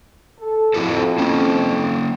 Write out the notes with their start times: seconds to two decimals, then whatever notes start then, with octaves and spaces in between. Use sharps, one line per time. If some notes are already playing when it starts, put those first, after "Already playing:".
0.38 A4
0.74 F2 E4 F#4 A4
1.18 A#3 C#4